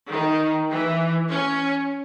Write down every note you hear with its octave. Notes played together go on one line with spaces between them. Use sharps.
D#3
E3
C#4